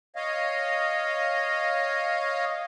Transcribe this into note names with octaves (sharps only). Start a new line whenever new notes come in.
C#5 D#5 F5